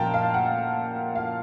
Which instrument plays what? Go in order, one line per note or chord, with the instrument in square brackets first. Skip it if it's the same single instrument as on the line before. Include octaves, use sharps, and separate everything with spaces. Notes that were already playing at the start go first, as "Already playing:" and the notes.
Already playing: [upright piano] A#2 F3 A#3 G5 A5 A#5
F5
F#5
F5